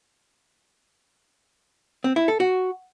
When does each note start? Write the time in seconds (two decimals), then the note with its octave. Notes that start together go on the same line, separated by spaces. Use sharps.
2.04 C4
2.16 E4
2.28 A4
2.40 F#4